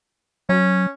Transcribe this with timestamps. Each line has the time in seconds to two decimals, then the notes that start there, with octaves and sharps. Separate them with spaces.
0.49 F#3 C#4